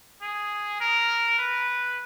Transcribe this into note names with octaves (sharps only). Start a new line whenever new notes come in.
G#4
A#4
B4